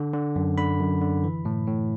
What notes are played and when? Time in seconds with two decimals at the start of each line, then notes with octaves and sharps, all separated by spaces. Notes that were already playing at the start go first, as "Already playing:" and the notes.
Already playing: D3
0.14 D3
0.36 F#2
0.58 D3 B5
0.80 F#2
1.01 D3
1.24 E3
1.45 A2
1.68 A2